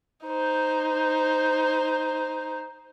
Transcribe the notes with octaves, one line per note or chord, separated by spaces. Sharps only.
D#4 C5